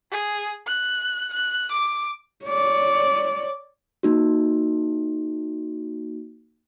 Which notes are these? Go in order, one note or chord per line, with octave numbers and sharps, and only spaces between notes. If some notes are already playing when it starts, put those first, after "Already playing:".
G#4
F#6
F#6
D6
C#5 D5
A#3 D#4 F#4